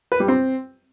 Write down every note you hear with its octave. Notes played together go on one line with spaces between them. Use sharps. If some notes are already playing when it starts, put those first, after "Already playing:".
B4
G3
C4